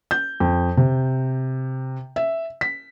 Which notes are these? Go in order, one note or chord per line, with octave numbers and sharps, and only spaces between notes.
G6
F2
C3
E5
B6